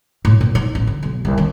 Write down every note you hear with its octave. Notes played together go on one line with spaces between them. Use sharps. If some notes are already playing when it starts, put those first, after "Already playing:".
A2
A#2
D#4
A1
D3
B1
C2
D#3